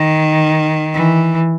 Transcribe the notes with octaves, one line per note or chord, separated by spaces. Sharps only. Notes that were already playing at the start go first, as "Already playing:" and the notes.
Already playing: D#3
E3